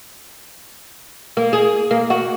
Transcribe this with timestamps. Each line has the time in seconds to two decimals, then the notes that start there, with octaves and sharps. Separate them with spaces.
1.37 A#3
1.53 G#4
1.91 A#3
2.10 F#4